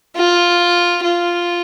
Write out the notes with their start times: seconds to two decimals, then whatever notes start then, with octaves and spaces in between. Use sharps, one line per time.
0.16 F4
1.04 F4